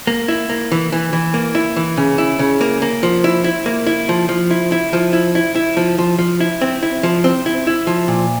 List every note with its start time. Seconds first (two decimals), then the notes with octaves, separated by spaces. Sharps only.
0.07 A#3
0.28 E4
0.49 A#3
0.72 E3
0.92 E3
1.13 E3
1.34 A#3
1.55 E4
1.76 E3
1.97 C#3
2.18 E4
2.39 C#3
2.61 A#3
2.82 A#3
3.03 F3
3.24 E4
3.44 E4
3.66 A#3
3.87 E4
4.09 F3
4.29 F3
4.51 E4
4.72 E4
4.93 F3
5.13 E4
5.35 E4
5.56 E4
5.77 F3
5.98 F3
6.19 F3
6.40 E4
6.61 C4
6.83 E4
7.03 F3
7.24 C4
7.46 E4
7.67 E4
7.87 F3
8.08 A#2